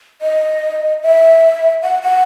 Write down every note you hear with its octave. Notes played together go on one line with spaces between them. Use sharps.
D#5
E5
F#5
F#5